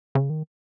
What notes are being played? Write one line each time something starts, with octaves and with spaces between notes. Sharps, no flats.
C#3
D#3